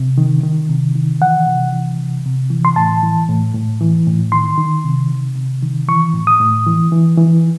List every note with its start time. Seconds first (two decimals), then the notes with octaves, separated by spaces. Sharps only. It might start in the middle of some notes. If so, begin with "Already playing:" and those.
Already playing: C3
0.18 D#3
0.43 D#3
0.69 C3
0.95 D#3
1.21 E3 F#5
1.47 C3
1.73 E3
1.99 C3
2.25 C3
2.50 E3
2.65 C6
2.76 A2 A5
3.03 E3
3.29 A2
3.54 A2
3.81 E3
4.07 A2
4.32 D#3 C6
4.58 D#3
4.84 C3
5.10 C3
5.36 C3
5.62 D#3
5.88 E3 C#6
6.14 A2
6.27 D#6
6.40 A2
6.67 E3
6.92 E3
7.18 E3